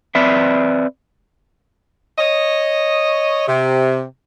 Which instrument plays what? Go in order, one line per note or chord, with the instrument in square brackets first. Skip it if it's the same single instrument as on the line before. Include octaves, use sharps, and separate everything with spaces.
[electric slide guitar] C4 B4 D5 E5
[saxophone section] C#5 D#5
C3